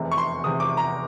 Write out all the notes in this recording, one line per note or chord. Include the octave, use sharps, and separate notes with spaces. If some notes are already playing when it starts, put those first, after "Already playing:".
Already playing: F1 E2 C3
C#6
C6
F1 E2 C3 D#6
D6
A#5